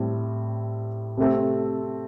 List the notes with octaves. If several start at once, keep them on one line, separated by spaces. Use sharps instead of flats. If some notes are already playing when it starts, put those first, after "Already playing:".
Already playing: A2 G3 C4
C3 A3 C4